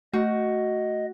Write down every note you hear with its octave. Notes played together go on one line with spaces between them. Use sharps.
A3 F#4 D#5